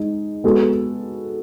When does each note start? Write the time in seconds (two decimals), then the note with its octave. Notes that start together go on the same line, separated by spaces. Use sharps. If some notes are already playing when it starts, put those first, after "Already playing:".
Already playing: G#3 D#4
0.44 G#3 B3 F#4 A4